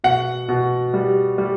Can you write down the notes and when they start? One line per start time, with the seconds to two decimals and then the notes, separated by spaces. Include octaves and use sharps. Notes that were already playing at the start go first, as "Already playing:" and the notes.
0.04 B2 F#5
0.48 B2
0.94 G3
1.38 G3